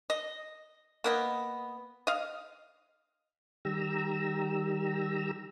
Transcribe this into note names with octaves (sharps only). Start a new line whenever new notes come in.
D#5
A#3 B3 D#5
D#5 F5
D#3 G3 G4 A#5 E6